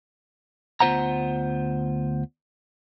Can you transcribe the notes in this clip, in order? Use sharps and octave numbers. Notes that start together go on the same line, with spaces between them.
D2 B3 F4 C5 F#5 A#5